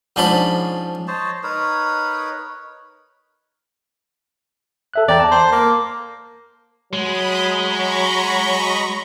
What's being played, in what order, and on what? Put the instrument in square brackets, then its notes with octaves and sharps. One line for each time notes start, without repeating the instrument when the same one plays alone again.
[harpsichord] G#2 F3 C#4 D4 D5 B5
[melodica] C5 C#5 D#5 A5
D#4 A#4 B4 C#5
[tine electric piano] A4 E5 F#6
[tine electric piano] E2 G5 A#5 [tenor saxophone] D5
[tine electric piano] A5
[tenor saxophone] C5
A#3
[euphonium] F#3 [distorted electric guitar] G#3 [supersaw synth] B5 D#6
[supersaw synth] A#5 B5 C#6